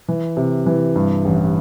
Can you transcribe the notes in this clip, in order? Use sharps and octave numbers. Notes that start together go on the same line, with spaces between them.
E3
C3
E3
G2
A1